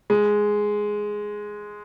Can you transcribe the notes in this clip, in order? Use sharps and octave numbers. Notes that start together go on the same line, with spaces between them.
G#3